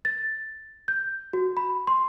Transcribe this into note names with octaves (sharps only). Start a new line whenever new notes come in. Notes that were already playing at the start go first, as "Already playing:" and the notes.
A6
G6
F#4
B5
C6